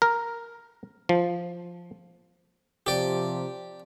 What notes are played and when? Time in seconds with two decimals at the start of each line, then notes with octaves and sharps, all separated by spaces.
0.02 A#4
1.09 F3
2.86 C3 F3 G4 D5